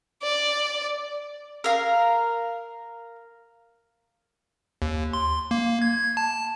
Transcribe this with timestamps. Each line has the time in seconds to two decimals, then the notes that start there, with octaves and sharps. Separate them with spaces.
0.23 D5
1.64 A#4 F5
4.82 D#2
5.13 C6
5.51 A#3
5.82 G#6
6.17 A5